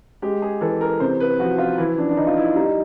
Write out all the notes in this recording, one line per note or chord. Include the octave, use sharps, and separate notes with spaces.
G#3 G4
G#4
E3 A4
A#4
C3 C5
B4
F3 F#4
F4
E3 E4
D4
D4
E3 D#4
F4
E4
G3 D#4